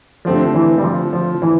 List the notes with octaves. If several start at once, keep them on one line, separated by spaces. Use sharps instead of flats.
D3 F3 A3 C4 G4
E3
G3
F3
F3
E3